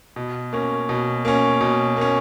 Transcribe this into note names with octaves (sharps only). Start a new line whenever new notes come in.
B2
A#3 C#4
B2
A#3 C#4
B2
A#3 C#4